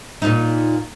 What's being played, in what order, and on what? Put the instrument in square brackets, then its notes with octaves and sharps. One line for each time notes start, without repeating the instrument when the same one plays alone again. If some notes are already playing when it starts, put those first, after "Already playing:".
[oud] A#2 D#4